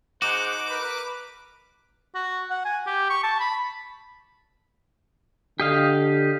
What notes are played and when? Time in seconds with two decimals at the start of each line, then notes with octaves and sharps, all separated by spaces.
0.22 D#4 F#4 G#4 C5 F#5 D6
0.68 A#4 B4
2.15 F#4
2.50 F#5
2.65 G#5
2.86 G4
3.10 C#6
3.23 A5
3.40 B5
5.60 D3 G4 D#5 F5